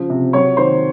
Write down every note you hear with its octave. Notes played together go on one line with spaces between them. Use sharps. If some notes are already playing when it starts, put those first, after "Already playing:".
Already playing: C#3 F3
C3
F#3 C#5 C#6
D#3 C5 C6